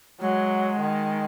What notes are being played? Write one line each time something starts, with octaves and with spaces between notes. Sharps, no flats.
F#3 G#3
D#3